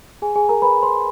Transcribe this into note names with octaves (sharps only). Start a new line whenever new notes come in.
G#4 G#5
G#4 G#5
A#4 A#5
B4 B5
C5 C6